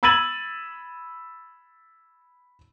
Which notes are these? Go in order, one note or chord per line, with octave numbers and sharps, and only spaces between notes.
B5 E6 G#6 A6 D#7 F#7